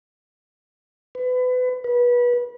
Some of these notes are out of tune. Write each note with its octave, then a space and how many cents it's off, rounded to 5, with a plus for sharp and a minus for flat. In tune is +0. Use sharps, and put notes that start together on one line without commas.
B4 +30
B4 -25